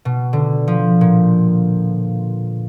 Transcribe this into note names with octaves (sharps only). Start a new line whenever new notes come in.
B2
D3
F3
A#2